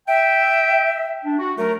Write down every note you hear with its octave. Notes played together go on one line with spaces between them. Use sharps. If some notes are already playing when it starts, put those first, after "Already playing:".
E5 G5
D4
F#4
F#3 A3 A#4